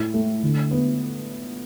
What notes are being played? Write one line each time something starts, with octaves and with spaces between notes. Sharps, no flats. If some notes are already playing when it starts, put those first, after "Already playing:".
Already playing: A2
A3
D3
B3